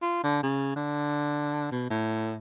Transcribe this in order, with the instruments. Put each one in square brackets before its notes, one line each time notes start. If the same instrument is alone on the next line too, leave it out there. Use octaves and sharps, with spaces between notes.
[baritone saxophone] F4
D3
C#3
D3
B2
A2